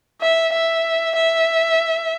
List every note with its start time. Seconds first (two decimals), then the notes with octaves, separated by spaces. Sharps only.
0.22 E5
0.53 E5
1.16 E5